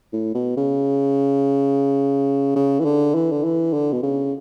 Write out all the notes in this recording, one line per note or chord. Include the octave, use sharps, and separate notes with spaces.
A2
B2
C#3
C#3
E3
D3
E3
D3
E3
D3
B2
C#3